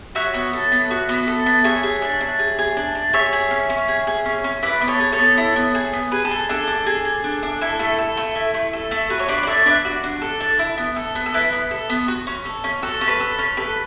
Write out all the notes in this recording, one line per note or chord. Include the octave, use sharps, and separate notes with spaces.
F#4 C#5 E5
B3
A4
B3
F#4
B3
A4
B3
G#4 C#5 E5
G#4
D4
D4
G#4
G#4
D4
D4
G#4 C#5 E5
G#4
C#4
C#4
G#4
G#4
C#4
C#4
E4 B4 D5
B3
A4 C#5
G#4
A4 C#5
B3
E4
B3
G#4
B3
G#4 B4
A4
G#4
D4 A4
D4
G#4
G#4
D4
D4
E4 A4
A3 A4
A4
A3
E4
A3
A4
A3
F#4 B4
C#5
D4 B4 D5
D5
A4 C#5 E5
D4 B4 D5
F#4
D4
A4
D4
E4
B3
A4
B3
A4
E4 B4
B3
A4
B3
F#4
C#4
A4
C#4
F#4 A4
C#4
B4
A4
C#4
A4 B4